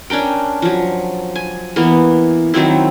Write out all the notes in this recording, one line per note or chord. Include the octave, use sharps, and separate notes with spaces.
C#4 D4 A#4 G5
F3 F#3
G#5
E3 A#3 B3
D#3 F#3 C4 E4